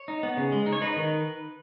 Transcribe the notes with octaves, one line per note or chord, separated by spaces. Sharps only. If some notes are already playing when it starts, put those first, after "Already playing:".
Already playing: C#5
D#4
B3
C#3
G#3
D#4
C#5
D#4 B4
D#3